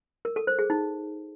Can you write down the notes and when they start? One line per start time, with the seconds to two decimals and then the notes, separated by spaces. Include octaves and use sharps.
0.25 A#4
0.36 A4
0.47 C5
0.59 G#4
0.70 D#4